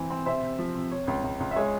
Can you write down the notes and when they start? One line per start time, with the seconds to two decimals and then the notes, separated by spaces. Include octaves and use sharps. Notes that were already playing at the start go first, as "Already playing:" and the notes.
Already playing: C3 E3 C4 C5
0.10 C4
0.26 C3 C5 E5
0.43 C3
0.59 F3
0.75 C3
0.91 C3 C#5
1.08 C#2
1.24 C#2
1.40 C#2
1.51 E5
1.56 G#3 C#5